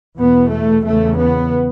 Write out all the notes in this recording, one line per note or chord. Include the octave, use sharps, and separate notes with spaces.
E2 B2 B3
A3
E2 C#3 A3
B3